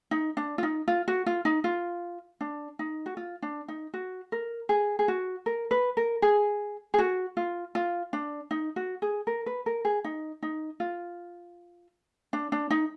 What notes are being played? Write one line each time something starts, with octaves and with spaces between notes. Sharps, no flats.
D#4
D4
F4
D#4
F4
F#4
F4
D#4
F4
D4
D#4
F#4
F4
D4
D#4
F#4
A#4
G#4
G#4
F#4
A#4
B4
A#4
G#4
G#4
F#4
F4
F4
D4
D#4
F#4
G#4
A#4
B4
A#4
G#4
D#4
D#4
F4
D4
D4
D#4